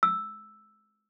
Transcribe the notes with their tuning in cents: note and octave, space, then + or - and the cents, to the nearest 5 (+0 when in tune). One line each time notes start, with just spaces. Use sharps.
E6 +0